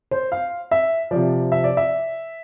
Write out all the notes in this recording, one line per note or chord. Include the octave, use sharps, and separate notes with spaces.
C5
F5
E5
C3 F3 D5
E5
D5
E5